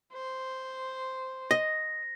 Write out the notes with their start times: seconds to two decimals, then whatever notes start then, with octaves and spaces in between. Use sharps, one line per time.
0.13 C5
1.51 D#5 A#6